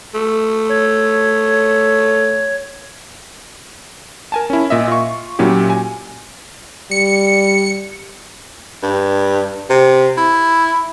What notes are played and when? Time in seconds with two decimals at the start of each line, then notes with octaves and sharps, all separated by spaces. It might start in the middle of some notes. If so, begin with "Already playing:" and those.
0.14 A3
0.69 C#5
4.32 A#4 G#5 A5
4.50 C#4 E4
4.70 A#2 D#5 E5
4.88 F4 C#6
5.39 A#2 F#3 C#4 E4 G4
5.70 G#5
6.91 G3 C#7
8.83 G2
9.70 C3
10.17 E4